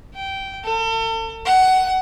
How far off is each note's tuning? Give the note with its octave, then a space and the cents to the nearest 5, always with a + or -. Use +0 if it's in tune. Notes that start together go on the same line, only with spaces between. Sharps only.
G5 -15
A4 +40
F#5 +20